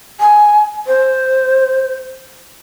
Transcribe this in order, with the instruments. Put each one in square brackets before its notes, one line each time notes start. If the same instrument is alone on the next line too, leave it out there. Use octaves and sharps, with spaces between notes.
[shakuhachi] G#5
C5